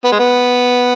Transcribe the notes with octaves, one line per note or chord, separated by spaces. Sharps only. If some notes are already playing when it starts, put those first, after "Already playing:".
B3
G#3
B3